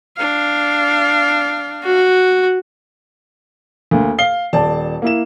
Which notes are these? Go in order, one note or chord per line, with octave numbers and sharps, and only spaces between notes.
D4 F5
F#4
D2 A#3
F5 C7 G7
D#1 D5 A5
A#3 E4 E7